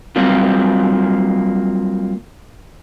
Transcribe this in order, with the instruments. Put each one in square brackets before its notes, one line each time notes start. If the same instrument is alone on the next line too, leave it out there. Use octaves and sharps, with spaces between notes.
[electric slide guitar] F#3 G3 A#3 C4 F4